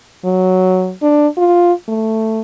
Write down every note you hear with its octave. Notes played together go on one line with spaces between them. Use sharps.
F#3
D4
F4
A3